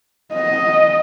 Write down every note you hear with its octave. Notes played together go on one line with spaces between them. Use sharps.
D#5